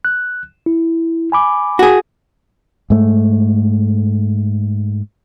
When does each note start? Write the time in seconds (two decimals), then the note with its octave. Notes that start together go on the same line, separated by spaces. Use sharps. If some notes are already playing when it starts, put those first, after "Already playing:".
0.05 F#6
0.66 E4
1.32 G#5 B5 D6
1.79 F#4 G#4
2.90 G#2 A3